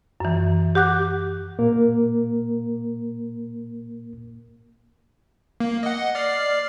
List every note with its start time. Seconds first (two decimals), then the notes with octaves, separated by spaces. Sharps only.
0.20 F#2 E3
0.75 G4 F#5 D6 F#6
1.59 A#2 A#3 A#4
5.60 A#3
5.83 D#5 F#5
6.15 D5 F6 C7